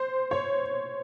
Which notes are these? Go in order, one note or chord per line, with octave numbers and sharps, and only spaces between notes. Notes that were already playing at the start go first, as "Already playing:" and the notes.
Already playing: C5
C#5